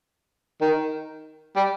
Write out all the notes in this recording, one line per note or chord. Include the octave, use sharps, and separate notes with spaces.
D#3
G3